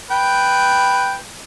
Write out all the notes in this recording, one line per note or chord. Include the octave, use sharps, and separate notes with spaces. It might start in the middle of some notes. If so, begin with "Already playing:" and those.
B4 G5